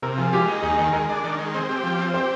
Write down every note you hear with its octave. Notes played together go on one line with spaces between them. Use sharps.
C3 A#4
F3 G#4
G#3 G4
D#4
D#2 G#4
D#3
G#3 A#4
D4
D#3
G#3
C4
G4
F3
C4
G4 C5